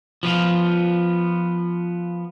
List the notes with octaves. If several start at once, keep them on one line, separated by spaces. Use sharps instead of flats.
F3 B3 F4